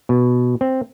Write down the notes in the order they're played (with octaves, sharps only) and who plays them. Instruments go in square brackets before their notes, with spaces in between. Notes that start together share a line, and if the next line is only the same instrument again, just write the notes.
[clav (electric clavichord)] B2
C4